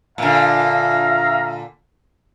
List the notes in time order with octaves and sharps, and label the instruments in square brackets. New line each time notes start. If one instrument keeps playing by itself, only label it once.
[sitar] A#2 D3 [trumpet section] E5 F5 A#5